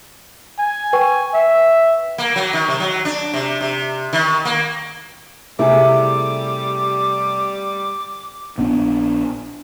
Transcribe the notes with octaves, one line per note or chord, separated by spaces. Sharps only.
G#5
B4 G5 C#6
E5
A#3
F#3
D#3
C3
F#3
D4
C3
C3
D#3
A#3
C3 G3 A3 E4 G#4 D6
A#1 B3 C4 D4